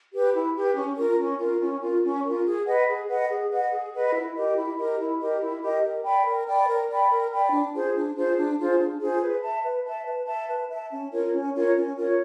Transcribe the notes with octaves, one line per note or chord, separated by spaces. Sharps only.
G4 B4
E4
G4 B4
C#4
F4 A#4
C#4
F4 A#4
C#4
F4 A#4
C#4
F4 A#4
G#4
B4 D#5 F#5
G#4
B4 D#5 F#5
G#4
B4 D#5 F#5
G#4
B4 D#5 F#5
E4
G4 A#4 D#5
E4
G4 A#4 D#5
E4
G4 A#4 D#5
E4
G4 A#4 D#5
A#4
D5 G5 B5
A#4
D5 G5 B5
A#4
D5 G5 B5
A#4
D5 G5 B5
D4
F4 G#4 C5
D4
F4 G#4 C5
D4
F4 G#4 C5
D4
F4 G#4 C5
B4
E5 A5
B4
E5 A5
B4
E5 A5
B4
E5 A5
C#4
F4 A#4 C#5
C#4
F4 A#4 C#5
C#4
F4 A#4 C#5